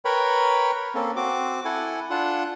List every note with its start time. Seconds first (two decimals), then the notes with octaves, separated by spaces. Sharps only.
0.05 A#4 B4 C#5 G5 B5
0.95 A#3 C4 C#4 A4
1.16 C4 F#4 D6
1.65 E4 A4 F#5 G#5
2.10 D4 F4 F#5